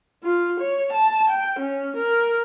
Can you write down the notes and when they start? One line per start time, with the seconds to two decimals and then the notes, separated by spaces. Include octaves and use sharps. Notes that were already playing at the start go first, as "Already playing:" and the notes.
0.23 F4
0.60 C#5
0.93 A5
1.30 G5
1.60 C#4
1.97 A#4